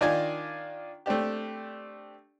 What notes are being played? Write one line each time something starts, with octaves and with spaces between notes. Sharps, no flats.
D#3 D4 F4 D5 D#5 G#5
A3 C4 D4 G4